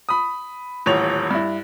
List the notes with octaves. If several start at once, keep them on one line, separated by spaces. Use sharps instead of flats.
B5 D#6
D#1 A1 C#5 F7
G2 E4